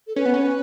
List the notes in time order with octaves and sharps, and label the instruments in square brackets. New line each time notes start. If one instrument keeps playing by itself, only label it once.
[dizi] A4
[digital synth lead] C#4 [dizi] B4
[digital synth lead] B3
C#4